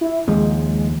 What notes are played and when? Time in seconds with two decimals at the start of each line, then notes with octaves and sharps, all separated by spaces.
0.01 E4
0.28 D#2 F3 G#3